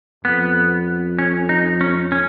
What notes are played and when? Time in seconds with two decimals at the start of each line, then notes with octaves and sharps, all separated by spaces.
0.25 F2 B3
1.19 C#4
1.49 D#4
1.81 C#4
2.12 C#4